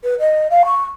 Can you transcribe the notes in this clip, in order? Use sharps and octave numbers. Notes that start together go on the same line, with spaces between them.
B4
D#5
F5
C#6